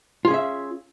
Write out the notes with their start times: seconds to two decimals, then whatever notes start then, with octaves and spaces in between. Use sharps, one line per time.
0.25 F4
0.28 G#4
0.31 C#4
0.34 E5